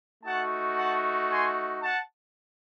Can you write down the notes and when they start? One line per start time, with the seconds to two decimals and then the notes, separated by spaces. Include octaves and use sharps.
0.24 A3 D#4 F#4 F#5 A5
0.77 F#5 A5
1.30 G#5 C6
1.82 F#5 A5